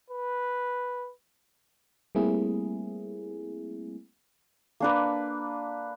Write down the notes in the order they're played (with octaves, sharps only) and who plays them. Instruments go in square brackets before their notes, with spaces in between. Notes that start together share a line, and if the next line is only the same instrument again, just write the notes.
[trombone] B4
[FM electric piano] G3 A3 A#3 C4 E4 G#4
[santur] A#3 D4 B4